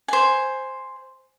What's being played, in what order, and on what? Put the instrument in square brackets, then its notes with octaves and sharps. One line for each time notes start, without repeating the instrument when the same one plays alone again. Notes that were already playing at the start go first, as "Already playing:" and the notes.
[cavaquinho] C5 G#5